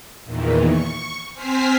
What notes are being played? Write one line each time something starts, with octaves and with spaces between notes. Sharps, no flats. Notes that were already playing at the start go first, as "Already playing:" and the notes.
E2 A#2 D#3 E3
C#6
C4 C5 G#5 F6 B6 C7